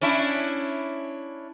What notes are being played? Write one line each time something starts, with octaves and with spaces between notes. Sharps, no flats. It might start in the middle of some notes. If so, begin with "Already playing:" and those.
C#4 D4 E4